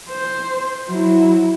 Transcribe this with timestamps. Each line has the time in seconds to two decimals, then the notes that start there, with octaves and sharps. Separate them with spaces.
0.10 C5
0.89 F#3 E4